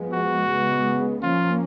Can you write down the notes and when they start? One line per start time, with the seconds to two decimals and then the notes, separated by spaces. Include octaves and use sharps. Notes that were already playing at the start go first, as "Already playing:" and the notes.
Already playing: F3 G#3 B3
0.13 F#4
0.49 C#3 G#3 B3
1.23 F3 A#3 C#4 F4